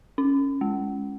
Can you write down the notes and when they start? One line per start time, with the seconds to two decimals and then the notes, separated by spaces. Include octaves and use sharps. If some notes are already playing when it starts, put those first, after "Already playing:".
0.18 C#4
0.61 G#3